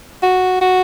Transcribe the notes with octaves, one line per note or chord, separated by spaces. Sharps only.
F#4
F#4